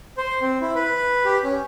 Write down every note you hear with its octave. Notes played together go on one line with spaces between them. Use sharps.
C5
C4
E4
B4
G4
C#4